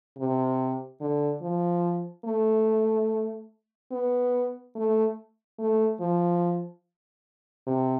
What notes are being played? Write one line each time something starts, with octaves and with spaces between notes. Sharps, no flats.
C3
D3
F3
A3
B3
A3
A3
F3
C3